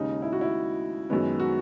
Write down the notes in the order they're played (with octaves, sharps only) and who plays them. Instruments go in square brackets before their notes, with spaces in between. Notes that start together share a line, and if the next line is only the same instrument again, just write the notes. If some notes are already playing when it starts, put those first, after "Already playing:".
Already playing: [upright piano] D#2 C#3 G#3 D#4
E4
F#4
E4
F#2 D#3 G#3 B3
F#4